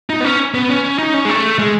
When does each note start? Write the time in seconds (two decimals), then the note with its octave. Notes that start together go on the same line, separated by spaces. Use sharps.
0.10 D#4
0.20 B3
0.24 C#4
0.54 B3
0.70 C#4
0.85 C#4
0.99 D#4
1.14 C#4
1.25 G#3
1.29 A3
1.59 G#3